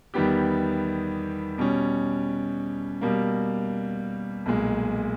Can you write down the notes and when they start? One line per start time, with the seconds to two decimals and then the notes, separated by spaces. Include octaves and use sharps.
0.14 E2 D#3 G3 B3 G4
1.58 B2 G3 C#4
3.01 B2 G3 A#3
4.46 B1 A#2 G#3